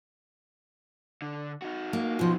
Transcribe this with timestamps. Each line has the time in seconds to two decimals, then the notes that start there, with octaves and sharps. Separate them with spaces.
1.22 D3
1.62 D#4 F#4
1.93 A#3
2.19 B2 F3 F4